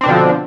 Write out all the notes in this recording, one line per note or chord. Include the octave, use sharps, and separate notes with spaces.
B2 D3 F3 C4 D4